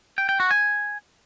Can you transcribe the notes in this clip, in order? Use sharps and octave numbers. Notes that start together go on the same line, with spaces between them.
G5
G5
F#4
G#5